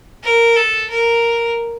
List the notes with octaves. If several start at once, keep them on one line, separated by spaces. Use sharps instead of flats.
A#4
A4
A#4